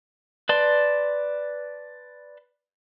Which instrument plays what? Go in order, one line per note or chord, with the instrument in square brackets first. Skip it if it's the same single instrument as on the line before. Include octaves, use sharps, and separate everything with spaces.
[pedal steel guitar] B4 D5 A5 C6